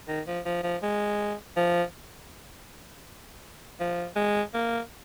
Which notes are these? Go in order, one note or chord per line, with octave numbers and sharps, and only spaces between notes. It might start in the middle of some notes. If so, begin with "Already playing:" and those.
D#3
F3
F3
F3
G#3
F3
F3
G#3
A#3